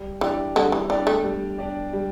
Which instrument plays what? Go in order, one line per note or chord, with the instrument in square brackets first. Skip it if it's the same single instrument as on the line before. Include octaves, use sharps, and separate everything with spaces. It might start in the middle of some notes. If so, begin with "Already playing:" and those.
Already playing: [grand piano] G3
[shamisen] E3 [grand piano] D4 G4 D5
[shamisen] D3 [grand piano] G3
[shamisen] E3
[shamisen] E3 [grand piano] D4 G4 D5
[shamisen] A3
[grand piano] G3
D4 G4 D5
G3